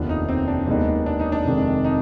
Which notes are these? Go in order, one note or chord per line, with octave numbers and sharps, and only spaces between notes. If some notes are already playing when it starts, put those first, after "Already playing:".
Already playing: F1 D#2 D#3 B3 D4 F4
D#4
C4
D4
D#2 D#3 G#3 B3 D#4
D4
D#4
D4
F1 F2 C3 D#3 G#3
D#4